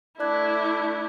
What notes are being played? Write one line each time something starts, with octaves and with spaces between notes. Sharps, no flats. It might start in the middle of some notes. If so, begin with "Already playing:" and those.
A3 D4 E4 D5 F#6 G#6